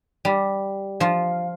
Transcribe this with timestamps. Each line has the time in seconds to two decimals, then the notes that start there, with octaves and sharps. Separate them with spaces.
0.25 G3
1.00 F3 F4